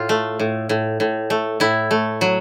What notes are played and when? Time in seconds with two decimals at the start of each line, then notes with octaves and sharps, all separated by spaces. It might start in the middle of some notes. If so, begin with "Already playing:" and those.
Already playing: A2 F4
0.09 A3
0.39 A2
0.69 A2
1.00 A2
1.30 A3
1.60 A2 E4
1.91 A3
2.21 F#3